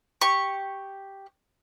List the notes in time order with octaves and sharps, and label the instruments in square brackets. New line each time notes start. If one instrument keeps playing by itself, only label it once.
[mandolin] G4 C#6